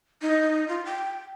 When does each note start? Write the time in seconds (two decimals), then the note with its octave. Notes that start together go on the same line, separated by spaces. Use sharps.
0.22 D#4
0.68 F4
0.85 G5